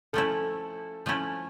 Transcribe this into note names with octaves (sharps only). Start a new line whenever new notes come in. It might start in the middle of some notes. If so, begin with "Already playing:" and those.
F3 A3 C#4 E4 A4
F3 A3 C#4 E4